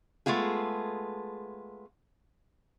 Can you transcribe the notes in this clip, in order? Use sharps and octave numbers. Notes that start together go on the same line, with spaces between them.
G#3 A3 B3 F4 G#4